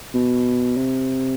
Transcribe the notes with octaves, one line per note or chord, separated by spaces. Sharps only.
B2
C3